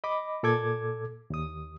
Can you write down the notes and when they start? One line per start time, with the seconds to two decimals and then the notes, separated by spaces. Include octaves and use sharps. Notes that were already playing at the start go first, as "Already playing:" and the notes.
0.04 D#5 B5 D6
0.43 A#2 A4 D6 G#6
1.30 D#2 D#6